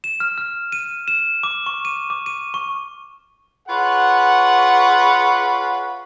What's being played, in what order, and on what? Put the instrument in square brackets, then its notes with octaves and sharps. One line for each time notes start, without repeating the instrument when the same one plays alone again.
[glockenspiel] E7
F6
F6
D#7
E7
D6
C#6
D#7
D6
D#7
C#6
[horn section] F4 G#4 B4 C#5 F#5